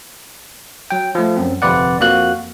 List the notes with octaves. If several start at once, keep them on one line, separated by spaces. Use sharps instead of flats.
F#3 G5
F3 A3
F#2 C4
G1 F2 C3 B4 D5 F#5
F2 F3 A#3 F#4 F5 F#6